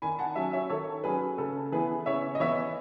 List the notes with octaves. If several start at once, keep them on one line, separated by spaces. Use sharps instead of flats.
D#3 G#5 B5
F#5 A5
F#3 C#4 E5 G#5
C#5 E5
D#3 A4 C#5
F#3 C#4 G#4 B4
C#3 A4
E3 B3 E4 G#4 B4
C#3 C#5 E5
D#5
E3 B3 E4 C#5 E5